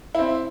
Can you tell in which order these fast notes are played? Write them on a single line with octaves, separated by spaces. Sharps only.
E4 C4 E5